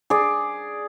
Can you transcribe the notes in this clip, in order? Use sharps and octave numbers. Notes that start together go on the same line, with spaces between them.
G#4 D5